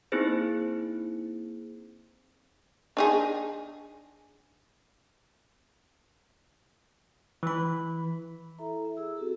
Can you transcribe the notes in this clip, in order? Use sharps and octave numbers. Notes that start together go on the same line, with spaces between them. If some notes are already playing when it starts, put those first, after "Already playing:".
A#3 C4 D#4 E4 G#4 C5
D4 D#4 G#4
E3 B5
E4 A4 E5 A#5
E5
G#4 E6
C4 F#4 G4 A4